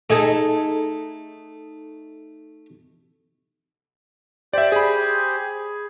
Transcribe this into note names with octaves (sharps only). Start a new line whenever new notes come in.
A3 D#4 G#4 A4
G4 C5 D5 E5
G#4 B5